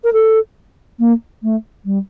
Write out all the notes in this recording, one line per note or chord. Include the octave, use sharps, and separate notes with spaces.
A#4
A4
A#3
A3
G3